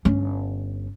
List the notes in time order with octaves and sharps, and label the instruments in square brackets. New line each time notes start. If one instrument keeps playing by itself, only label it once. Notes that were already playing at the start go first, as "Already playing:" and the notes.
[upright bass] G1 C#4